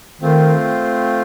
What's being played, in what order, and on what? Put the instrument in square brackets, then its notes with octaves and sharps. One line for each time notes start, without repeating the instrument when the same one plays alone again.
[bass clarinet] D#3 [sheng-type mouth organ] A3 C4 F4